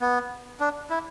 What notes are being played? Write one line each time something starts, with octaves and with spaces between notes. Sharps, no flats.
B3
D4
E4